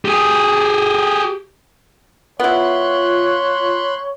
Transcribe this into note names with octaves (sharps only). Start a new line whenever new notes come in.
G4 G#4
B3 E4 F4 C#5 B5 C6 F#6